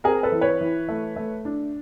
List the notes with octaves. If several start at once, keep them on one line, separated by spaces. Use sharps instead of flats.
C4 G#4 A#4
A4 B4
E3
B4 C#5
E3
A3
A3
D4